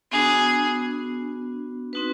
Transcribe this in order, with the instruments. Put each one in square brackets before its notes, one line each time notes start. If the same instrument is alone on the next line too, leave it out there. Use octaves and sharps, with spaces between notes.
[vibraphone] B3 D4 F#4 [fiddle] G#4
[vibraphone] C4 D#4 F#4 B4